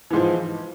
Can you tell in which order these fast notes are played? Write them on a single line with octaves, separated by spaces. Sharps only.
E3 G#2 F3